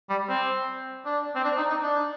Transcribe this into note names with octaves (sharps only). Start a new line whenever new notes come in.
G3
C4
D4
C4
D4
D#4
D#4
D4